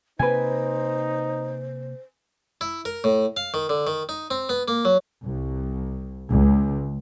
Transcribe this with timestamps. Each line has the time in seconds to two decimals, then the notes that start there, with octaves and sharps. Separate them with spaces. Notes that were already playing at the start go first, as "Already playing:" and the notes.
0.19 C3 A#3 D#4 B4 C5 G#5
2.61 E4
2.85 A#4
3.04 A2
3.37 F5
3.54 D#3
3.69 D3
3.87 D#3
4.09 D#4
4.31 C4
4.49 B3
4.68 A#3
4.85 F#3
5.24 C2
6.29 C#2